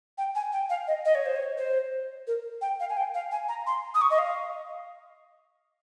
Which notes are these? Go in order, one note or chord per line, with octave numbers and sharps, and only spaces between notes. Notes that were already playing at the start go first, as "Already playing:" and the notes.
G5
G#5
G5
F5
D#5
D#5
C#5
C5
C#5
C5
A#4
G5
F5
G#5
G5
F5
G#5
A#5
C6
D#6
C#6
D#5
F5